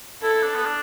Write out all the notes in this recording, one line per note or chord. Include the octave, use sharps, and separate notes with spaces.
E4 A4
E4
D4
B3
D4